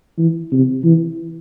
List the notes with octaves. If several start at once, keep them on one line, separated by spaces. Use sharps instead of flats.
E3
C3
E3